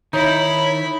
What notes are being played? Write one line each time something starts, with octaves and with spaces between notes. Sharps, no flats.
D#3 D#4 E4 C#5 B5